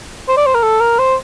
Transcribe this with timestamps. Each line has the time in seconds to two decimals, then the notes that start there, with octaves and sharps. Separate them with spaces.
0.28 C5
0.37 D5
0.46 C5
0.54 A#4
0.63 A4
0.80 A#4
0.99 C5